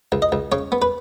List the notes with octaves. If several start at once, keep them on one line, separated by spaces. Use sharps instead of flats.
C#2
D#5
C#2
C#3 C#5
B3
B4